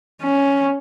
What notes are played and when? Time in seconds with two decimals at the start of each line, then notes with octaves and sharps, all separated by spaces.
0.22 C#4